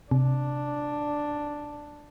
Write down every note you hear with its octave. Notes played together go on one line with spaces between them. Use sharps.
C3 D4